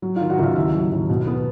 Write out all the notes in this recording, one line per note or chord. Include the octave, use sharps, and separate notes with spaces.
F#3
F4 F5
D#3
F#4 F#5
C#2 F4 E5 F5
D#2 E4 E5
F#3
D#2
B2
B3